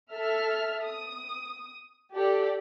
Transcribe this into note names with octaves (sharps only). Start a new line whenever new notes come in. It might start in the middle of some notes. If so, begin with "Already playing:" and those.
A4 E5 F6
D#6
G4 A4 D5